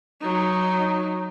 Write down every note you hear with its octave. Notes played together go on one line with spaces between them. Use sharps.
F#3 D#4